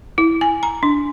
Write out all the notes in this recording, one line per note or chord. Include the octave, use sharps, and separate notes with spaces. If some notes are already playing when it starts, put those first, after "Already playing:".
E4
G#5
A#5
D4